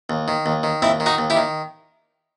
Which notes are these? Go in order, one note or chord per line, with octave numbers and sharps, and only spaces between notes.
D#2
D#3
D#2
D#3
D#2 C4 E4
D#3
D#4 F#4
D#2
E4 G4
D#3